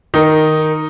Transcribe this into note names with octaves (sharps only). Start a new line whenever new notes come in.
D#3 D#4